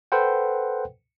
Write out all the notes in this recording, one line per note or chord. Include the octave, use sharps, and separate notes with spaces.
A4 B4 C5 F#5 G5